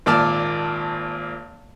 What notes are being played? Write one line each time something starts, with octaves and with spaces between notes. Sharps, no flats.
G#1 A#2 D5 A5 F6